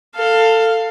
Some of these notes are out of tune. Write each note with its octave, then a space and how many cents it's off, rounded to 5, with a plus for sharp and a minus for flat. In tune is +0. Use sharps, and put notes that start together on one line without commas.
A4 +20 F5 +0